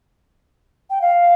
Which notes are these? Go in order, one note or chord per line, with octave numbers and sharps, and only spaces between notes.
G5
F5